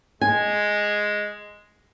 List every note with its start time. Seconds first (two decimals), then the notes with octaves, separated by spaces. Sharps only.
0.21 G#3 G#5